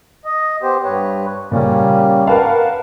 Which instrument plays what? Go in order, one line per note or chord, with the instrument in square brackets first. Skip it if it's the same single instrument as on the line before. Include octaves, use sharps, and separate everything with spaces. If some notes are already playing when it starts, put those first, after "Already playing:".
[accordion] D#5
B3 G4 C5
G2 B4 C#5
[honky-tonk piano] A#2 C#3 [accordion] G3 A#3 C#4
[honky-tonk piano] A#4 B4 F5 [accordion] F#5 A5